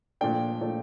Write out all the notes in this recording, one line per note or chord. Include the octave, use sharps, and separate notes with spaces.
A#2 F3 A3 D4 G5
A#2 F3 A3 D4